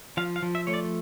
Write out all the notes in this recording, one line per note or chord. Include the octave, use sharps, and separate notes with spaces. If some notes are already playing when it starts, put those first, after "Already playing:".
F3 F5
F5
F3
E5
A3 C#5
D5